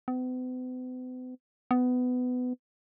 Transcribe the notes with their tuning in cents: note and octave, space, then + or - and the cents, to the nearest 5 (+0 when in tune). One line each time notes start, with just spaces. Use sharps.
B3 +45
B3 +20